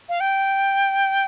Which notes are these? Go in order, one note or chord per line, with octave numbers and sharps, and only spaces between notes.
F5
G5